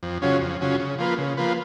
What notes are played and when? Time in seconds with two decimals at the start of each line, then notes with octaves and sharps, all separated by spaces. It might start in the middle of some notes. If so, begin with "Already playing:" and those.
0.03 F2
0.22 C#3 F#3 C#4 F4
0.41 F2
0.61 C#3 F#3 C#4 F4
0.79 C#3
0.99 F3 A#3 F4 B4
1.18 C#3
1.37 F3 A#3 F4 B4